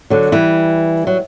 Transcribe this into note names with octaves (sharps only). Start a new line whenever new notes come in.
D3 F#3
E3 G3
F#3